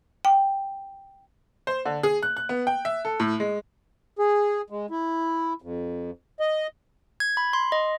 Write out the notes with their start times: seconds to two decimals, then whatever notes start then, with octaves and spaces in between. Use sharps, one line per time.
0.25 G5
1.67 C5
1.85 D3
2.03 G#4
2.23 F#6
2.37 F#6
2.49 B3
2.67 G5
2.85 E5
3.05 A4
3.20 A2
3.40 G#3
4.19 G#4
4.70 G#3
4.90 E4
5.62 F2
6.40 D#5
7.20 G#6
7.37 B5
7.53 C6
7.72 D#5